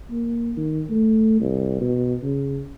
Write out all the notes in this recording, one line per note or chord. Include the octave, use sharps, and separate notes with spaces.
A#3
D#3
A3
C2
B2
C#3